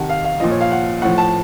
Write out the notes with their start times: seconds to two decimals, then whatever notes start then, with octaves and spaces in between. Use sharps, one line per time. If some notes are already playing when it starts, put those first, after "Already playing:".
Already playing: C3 D#3 F#5 A5
0.09 F5
0.24 F5
0.40 A#2 F3 D#5
0.51 C#5
0.61 F5
0.72 F#5
1.02 A2 F3 F#5
1.18 A5